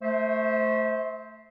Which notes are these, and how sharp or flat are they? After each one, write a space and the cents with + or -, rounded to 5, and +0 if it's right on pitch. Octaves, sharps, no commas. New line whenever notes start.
A3 +0 C5 +0 E5 -35